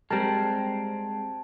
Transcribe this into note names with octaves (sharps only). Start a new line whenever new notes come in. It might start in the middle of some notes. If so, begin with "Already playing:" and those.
G3 G#3 C4 A#4 A5